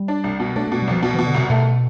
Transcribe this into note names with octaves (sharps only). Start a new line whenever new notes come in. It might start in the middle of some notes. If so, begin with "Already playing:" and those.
Already playing: G3
D4
C2
B2
A3 D4
B2 A3
G3
C2 F3
B2
B2 E3
D3
C2 C3
B2 A3